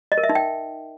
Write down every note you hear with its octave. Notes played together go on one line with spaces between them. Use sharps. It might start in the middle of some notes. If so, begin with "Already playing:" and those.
D#5
A#4
E5
D#4
G5